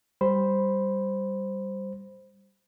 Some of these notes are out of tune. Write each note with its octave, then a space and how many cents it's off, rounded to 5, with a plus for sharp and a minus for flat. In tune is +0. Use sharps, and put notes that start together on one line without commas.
G3 +0 C5 +0 B5 +0